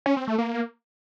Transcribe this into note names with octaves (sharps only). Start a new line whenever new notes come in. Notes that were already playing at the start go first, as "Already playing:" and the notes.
C#4
C4
A3
A#3